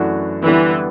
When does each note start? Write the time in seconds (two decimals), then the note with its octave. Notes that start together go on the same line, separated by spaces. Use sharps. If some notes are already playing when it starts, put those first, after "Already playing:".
Already playing: F#2 E3 A3 D4 F#4
0.45 D3 E3 G3 B3